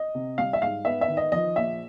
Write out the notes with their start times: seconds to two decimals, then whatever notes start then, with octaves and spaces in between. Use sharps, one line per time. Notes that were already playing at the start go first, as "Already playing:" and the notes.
Already playing: D#5
0.15 C3
0.38 G3 F5
0.53 E5
0.62 G#2 F5
0.85 B3 E5
1.01 E5
1.08 D#3
1.17 D#5
1.32 F3 D#5
1.56 A#1 E5